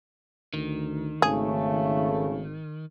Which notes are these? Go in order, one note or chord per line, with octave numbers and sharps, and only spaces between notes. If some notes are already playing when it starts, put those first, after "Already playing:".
D2 D#3
G#1 C#3 A3 G#4